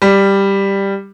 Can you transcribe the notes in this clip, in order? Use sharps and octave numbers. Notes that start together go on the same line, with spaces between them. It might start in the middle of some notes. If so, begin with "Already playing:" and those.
G3